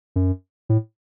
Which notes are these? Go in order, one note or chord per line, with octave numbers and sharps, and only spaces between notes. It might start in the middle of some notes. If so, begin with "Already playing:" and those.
F#2
A2